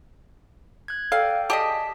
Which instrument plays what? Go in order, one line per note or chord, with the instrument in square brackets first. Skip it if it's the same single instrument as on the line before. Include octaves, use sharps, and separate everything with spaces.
[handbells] F#6 G#6
[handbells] A4 D5 G5 [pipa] F5
[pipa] G4 G#4 D#5 [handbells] A5 B6